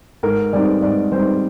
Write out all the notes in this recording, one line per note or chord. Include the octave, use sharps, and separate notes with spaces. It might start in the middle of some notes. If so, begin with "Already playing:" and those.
G#2 A#4
G3 C4 D#4 D5
G#2 D5
G3 C4 D#4 C5